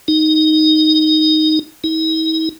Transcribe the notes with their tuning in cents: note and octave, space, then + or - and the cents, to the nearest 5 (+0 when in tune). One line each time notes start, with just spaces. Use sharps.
D#4 +0
D#4 +45